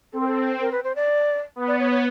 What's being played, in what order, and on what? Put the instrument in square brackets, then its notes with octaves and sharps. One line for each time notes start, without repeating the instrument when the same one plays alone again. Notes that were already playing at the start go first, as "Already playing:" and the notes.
[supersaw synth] C4 [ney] A4
[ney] A#4
A4
A#4
B4
C5
D5
[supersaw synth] B3
[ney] D5
C#5
C#5